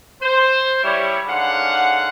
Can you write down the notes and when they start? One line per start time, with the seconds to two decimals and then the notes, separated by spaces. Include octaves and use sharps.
0.22 C5
0.83 G3 E4 C#5
1.27 G#2 D3 C#4 F5 F#5